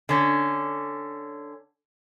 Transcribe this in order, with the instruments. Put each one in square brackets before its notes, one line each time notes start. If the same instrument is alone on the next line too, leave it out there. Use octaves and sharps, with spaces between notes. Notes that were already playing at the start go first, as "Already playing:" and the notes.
[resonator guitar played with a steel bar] D3 C#4